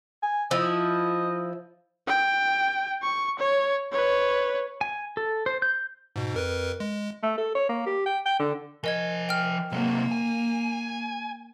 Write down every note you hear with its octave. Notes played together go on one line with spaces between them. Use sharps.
G#5
F3 E4 D#5
G5
C#6
C#5
B4 C#5
G#5
A4
C5
G6
G#2 B2
F2 A#4 B4
G#3
A3
A4
C#5
A#3
G4
G5
G5
D3
F3 A#4 D#5 G#5 G#6
G5 F6
C3 F#3 A#3
G#5